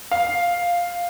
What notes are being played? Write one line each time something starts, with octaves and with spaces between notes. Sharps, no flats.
F5